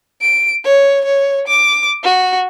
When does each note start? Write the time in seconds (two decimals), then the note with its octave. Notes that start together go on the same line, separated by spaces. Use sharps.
0.22 D7
0.64 C#5
1.05 C#5
1.47 D6
2.04 F#4